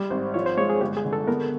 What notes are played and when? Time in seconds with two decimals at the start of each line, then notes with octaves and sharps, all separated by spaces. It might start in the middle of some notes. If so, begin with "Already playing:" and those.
Already playing: G3
0.10 G#1 C5
0.34 F3 C#5
0.46 C5
0.57 G#3 C#5
0.70 G#4
0.81 G1 G4
0.97 G#4
1.05 D3
1.13 A4
1.27 B3 A#4